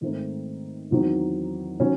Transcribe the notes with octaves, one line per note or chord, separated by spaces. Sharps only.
G#2 D#3 A3 C4 D#4
E2 D#3 F#3 C4 D#4
D#3 F#3 C#4